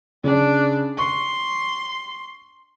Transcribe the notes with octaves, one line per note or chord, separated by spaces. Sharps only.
C#3 D4
C6 C#6